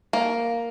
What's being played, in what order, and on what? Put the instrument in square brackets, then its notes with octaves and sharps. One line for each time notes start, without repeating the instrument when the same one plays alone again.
[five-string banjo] A#3